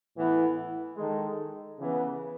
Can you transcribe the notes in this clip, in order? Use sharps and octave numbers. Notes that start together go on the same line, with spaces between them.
A2 E3 B3 E4
D#3 G#3 D#4 A4
C#3 E3 B3